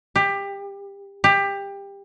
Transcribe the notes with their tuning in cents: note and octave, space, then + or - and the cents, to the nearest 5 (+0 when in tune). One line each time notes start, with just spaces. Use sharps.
G4 +20
G4 +20